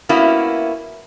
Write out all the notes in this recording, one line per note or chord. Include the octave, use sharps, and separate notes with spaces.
A#3 B3 C#4 E4 F#4